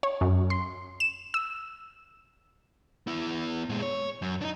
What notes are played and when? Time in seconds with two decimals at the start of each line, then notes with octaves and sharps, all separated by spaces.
0.03 C#5
0.21 F#2
0.50 C6
1.00 E7
1.34 E6
3.07 B3 E4
3.69 A#2 G#3
3.82 C#5
4.22 F#2
4.42 D4 D#4